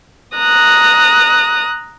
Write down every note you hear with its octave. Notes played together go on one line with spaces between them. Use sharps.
A#5 D#6 F#6